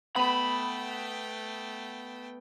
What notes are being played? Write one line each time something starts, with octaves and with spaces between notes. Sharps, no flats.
A3 B3 G5 B5